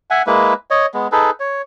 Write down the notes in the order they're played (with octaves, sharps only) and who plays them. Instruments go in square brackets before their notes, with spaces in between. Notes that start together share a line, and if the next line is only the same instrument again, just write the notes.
[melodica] E5 F#5 G#5
G#3 A#3 E4 B4
C#5 D#5
G#3 B3
D#4 G#4 A4 B4
C#5